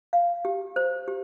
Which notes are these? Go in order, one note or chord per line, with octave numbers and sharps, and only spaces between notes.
F5
G4
C5
G4